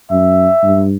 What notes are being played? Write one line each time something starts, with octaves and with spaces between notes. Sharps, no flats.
F#2 E5
G2